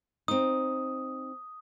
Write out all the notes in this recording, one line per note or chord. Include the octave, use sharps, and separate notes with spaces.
C4 D#4 D#6